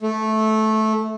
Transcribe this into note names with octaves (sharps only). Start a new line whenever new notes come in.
A3